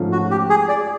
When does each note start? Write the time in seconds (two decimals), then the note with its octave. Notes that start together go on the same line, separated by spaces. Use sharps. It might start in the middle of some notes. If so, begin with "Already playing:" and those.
Already playing: G#2 F3 A3 C#4 F4
0.12 F#4
0.31 G4
0.50 G#4
0.69 D5